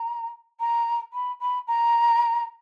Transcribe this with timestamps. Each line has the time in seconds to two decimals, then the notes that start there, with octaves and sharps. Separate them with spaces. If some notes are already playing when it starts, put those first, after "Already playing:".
Already playing: A#5
0.59 A#5
1.13 B5
1.40 B5
1.67 A#5